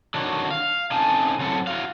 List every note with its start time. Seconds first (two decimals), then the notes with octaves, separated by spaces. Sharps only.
0.14 D3 D#3 D4 F#4 C#5
0.51 F5
0.91 C#3 C4 D#4 A4 G#5 A5
1.39 F#2 F#3 C4 E4 A4 F#5
1.67 E4 F#4 F5